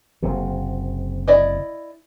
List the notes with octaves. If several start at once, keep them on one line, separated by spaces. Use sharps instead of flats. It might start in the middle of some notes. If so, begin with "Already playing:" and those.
F#1 C3
E4 D5 D#5